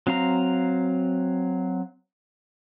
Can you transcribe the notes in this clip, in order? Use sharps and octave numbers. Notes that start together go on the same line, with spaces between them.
F#3 C4 F5 A#5